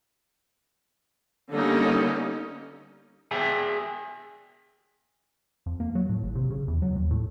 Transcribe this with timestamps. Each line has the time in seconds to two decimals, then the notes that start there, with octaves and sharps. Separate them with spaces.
1.51 D3 G3 A#3 B3 C#4 D#4
3.31 G#4 E5 G5 G#5
5.66 F2
5.80 A#3
5.95 F#3
6.09 A2
6.23 G#1
6.35 C3
6.50 C#3
6.68 E2
6.82 F#3
6.96 D#2
7.11 A2